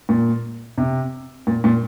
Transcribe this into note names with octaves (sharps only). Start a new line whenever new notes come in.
A#2
C3
A#2
A#2